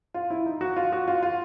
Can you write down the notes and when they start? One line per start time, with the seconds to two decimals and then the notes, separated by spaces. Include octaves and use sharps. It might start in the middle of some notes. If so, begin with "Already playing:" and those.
0.14 F4
0.30 E4
0.46 D#4
0.61 F#4
0.76 F4
0.92 F#4
1.08 F4
1.23 F4